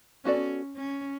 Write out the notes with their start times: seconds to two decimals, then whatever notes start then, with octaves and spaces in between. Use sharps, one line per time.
0.25 B3 C#4 F#4 A4 D5
0.77 C#4